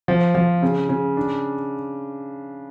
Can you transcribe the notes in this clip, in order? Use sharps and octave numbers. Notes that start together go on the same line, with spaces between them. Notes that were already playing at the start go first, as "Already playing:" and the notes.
F3
F3
C#3
C#3
D4